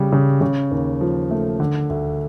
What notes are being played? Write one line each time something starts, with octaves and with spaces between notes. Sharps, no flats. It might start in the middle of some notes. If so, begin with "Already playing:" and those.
Already playing: C#3 G3
C#3
C#3
D#2
F3
A3
D3
D2